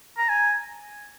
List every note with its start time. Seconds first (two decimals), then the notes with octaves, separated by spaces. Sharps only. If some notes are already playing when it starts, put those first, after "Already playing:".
0.18 A#5
0.29 G#5